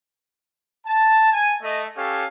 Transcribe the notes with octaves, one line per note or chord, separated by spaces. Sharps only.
A5
G#5
A3 D#5
C#4 G4 A4 C#5 F5